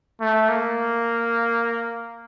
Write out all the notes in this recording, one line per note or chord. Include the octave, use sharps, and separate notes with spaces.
A3
A#3